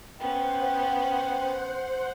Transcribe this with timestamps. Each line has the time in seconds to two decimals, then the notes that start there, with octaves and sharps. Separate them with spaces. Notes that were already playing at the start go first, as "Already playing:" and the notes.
0.20 B3 C#4 C5 F#5 G5